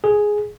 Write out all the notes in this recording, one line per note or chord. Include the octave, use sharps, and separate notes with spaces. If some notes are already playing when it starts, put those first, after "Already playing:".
G#4